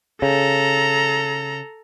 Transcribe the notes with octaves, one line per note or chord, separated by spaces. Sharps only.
C#3 A4 A#5